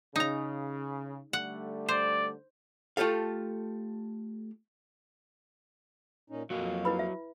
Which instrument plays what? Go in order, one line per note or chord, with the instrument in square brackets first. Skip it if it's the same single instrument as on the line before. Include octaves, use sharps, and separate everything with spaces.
[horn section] C#3 [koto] D#4 A#5
[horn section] D3 G3 A3 [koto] F#5
[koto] C5 [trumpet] D5
[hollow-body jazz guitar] A3 F4 G4 A4 F5
[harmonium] A#2 C#4 D#4
[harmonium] F2 A#3 F5 [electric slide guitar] F#3 F#4 D#5
[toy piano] E4 B4 B5
E5